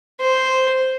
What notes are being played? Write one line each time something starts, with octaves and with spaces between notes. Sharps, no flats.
C5